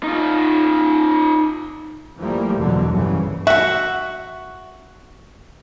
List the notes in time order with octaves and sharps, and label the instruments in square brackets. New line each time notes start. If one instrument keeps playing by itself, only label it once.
[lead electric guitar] D#4 F4
[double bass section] E3 F3 G3 A3 A#3
E2 B2 D3 F#3
F#1 C2 G2 C#3 E3
[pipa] F#4 [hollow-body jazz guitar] E5 F#5